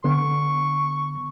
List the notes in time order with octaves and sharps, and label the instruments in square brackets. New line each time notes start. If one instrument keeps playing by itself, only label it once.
[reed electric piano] D3 B3 [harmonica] C#6